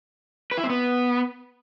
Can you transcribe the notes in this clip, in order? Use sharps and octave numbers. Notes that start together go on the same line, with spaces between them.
B4
E4
C4
B3